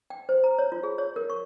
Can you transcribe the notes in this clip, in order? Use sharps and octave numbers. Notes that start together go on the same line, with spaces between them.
G5
C5
A#5
C#5
F4
G#4
C#5
A#4
C#6